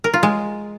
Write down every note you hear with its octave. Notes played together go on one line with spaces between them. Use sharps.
A#4
F4
G#3